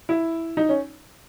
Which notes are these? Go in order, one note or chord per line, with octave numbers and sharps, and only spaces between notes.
E4
D#4
C#4